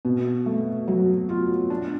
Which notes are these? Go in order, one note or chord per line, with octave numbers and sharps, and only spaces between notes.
B2
A3
F#3
F4
D4